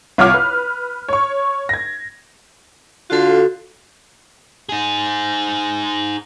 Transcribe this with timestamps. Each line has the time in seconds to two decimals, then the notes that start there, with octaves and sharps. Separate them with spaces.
0.18 C2 F4 C#5 F#5 D6 F6
0.34 B4
1.08 C#5 C#6
1.69 G#6 A#6
3.10 D3 F4 F#4 A4
4.69 D#4 G#4